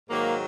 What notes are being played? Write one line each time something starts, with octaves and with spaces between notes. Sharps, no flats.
G#2 D#3 F#3 A#3